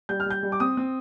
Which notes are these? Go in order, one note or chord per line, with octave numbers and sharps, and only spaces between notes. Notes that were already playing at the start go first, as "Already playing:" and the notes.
G3 G6
F6
G3 G6
G3
D6
C4 D#6
C4